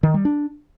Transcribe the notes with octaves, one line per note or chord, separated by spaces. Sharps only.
D#3
G3
D4